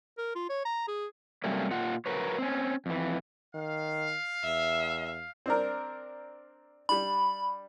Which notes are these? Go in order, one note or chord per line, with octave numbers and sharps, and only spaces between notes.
A#4
F4
C#5
A#5
G#4
C3 F#3 G3 A3 A#3 C#4
A#2 F4 F#5
F#3 A#4 B4 C#5
C4 C#4
F2 E3
D#3 F5
E2 E5
C4 D4 A#4
G3 D4 B5